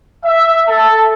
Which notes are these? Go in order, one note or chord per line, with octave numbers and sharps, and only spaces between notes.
E5
A4